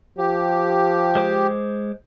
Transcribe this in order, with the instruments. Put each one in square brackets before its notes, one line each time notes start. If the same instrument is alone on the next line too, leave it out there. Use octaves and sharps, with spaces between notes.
[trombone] F3 [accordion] G4
[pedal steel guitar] G#3 C5 D6